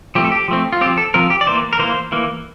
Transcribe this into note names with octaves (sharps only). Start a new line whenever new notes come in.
F3 A3 C4 G4
A4
G4
F3 A3 C4
F4
F3 C4 G4
A4
F3 C4 A#4
G4
D5
E3 A#3 C5
A#4
E3 A#3 C5
E3 A#3